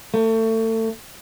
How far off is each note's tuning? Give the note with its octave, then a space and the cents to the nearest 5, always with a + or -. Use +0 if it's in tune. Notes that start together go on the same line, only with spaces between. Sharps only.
A3 +30